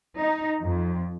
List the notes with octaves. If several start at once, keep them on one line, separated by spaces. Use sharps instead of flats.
D#4
F2